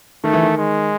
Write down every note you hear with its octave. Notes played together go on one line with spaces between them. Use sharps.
D#3 A3
E3
D#3
G#3